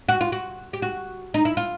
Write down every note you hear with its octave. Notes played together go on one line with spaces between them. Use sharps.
F#4
F4
F#4
G4
F#4
D#4
E4
F4